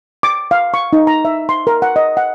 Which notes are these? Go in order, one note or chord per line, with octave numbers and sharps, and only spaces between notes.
D6
F5
C#6
D#4
A#5
E5
C6
A#4
F#5
D#5
F#5